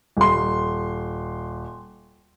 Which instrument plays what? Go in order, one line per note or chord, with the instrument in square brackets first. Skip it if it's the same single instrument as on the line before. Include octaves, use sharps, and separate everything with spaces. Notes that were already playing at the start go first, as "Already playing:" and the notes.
[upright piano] D#1 C6